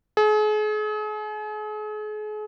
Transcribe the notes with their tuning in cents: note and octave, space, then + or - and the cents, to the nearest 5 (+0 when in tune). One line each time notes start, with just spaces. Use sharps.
G#4 +40